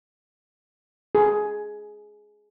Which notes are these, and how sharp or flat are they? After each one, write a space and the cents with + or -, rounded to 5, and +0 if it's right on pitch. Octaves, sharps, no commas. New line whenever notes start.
G#4 +10